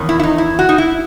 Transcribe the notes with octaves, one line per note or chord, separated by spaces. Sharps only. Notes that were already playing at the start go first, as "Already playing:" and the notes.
Already playing: E2 D#3 C#4
E4
E4
D#4
E4
F#4
D#4
E4